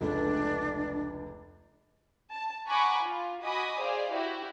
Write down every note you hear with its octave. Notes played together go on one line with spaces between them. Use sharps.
F1 C#2 A3 D4
A5
F#5 G#5 A#5 B5 C#6 D6
F4
F#4 D#5 G#5 B5 D6 D#6
G#4 C5 D5 F5
E4 F#4 G4